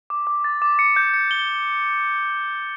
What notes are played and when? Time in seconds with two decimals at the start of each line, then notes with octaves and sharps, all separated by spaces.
0.10 D6
0.27 D6
0.44 A6
0.62 D6
0.79 C#7
0.96 G6
1.14 C#7
1.31 G7